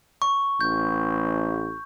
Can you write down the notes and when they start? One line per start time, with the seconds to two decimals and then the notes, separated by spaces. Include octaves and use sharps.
0.22 C#6
0.61 A1 G6